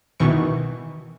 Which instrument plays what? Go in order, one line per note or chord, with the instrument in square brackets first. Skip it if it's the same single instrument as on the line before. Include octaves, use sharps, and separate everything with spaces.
[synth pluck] B2 D#3 E3 C#6